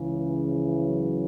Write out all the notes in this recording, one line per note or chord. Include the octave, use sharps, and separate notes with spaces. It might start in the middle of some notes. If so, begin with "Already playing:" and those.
Already playing: C#2 C#3 E3
F3
F#3